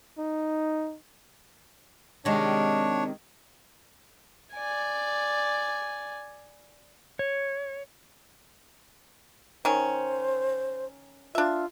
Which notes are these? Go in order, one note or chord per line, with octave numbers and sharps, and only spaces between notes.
D#4
C3 D#3 G#3 D4 C#5
D5 G#5
C#5
D#3 C#4 C5
D4 F4 E5